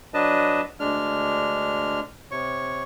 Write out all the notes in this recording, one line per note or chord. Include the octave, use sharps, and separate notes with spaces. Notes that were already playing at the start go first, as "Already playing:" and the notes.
F#3 D4 B4 D#5 A5
D2 G#3 D4 F6
C3 C#5 C#6